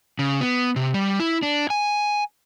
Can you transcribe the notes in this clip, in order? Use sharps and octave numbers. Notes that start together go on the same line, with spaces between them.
C#3
B3
C3
G3
E4
D4
G#5